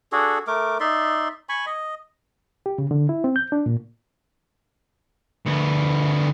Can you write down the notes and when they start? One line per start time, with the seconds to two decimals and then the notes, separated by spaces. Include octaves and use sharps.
0.12 D4 F#4 G#4 A4
0.47 A3 A#4 D6
0.80 D#4 D5 E5 C6
1.49 G#5 B5 C#6
1.66 D#5
2.66 G4
2.78 C#3
2.91 D3
3.09 E4
3.24 C4
3.36 G6
3.52 D4
3.66 A#2
5.46 D2 B3